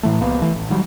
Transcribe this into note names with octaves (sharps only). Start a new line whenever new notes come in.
A2 E3 A3
C2 A#3 B3
E3 A3
A1
D#3 F#3 G3